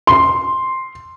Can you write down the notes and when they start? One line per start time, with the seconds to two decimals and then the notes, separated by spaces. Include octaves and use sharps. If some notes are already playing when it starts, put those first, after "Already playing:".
0.07 C6